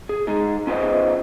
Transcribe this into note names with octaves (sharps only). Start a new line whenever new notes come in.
G#4
G#3 D#4 G#4
C#4 F4 G#4 B4 C5 D#5